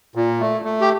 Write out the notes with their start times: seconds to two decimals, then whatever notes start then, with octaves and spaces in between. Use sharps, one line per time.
0.15 A#2
0.40 A3
0.65 A3
0.81 G4